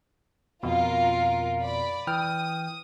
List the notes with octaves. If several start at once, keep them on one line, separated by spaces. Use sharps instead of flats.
F2 B2 F4 A#4
D5 B5
E3 G5 D#6 F6